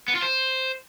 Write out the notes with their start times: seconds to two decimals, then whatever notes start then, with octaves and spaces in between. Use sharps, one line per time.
0.08 B3
0.15 F4
0.22 C5